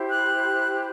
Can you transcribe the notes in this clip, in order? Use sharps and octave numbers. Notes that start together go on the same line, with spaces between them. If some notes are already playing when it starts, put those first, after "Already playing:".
Already playing: E4 G4 C5
F#6